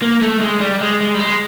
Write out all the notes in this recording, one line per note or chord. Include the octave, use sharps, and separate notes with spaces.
A#3
A3
G#3
G3
G#3
G#3
G3
G#3